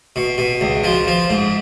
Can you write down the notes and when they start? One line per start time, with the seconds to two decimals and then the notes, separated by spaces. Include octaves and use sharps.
0.16 B2
0.38 B2
0.61 C#2
0.84 F3
1.07 F3
1.30 G#2